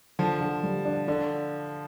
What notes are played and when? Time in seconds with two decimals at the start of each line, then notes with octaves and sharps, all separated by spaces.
0.19 D3 F3
0.41 D3
0.63 G3
0.85 D4
1.08 D3 D4